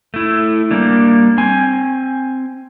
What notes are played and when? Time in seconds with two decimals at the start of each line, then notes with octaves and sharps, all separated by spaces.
0.14 A3 E4
0.71 G3 A#3 D4
1.38 C4 G#5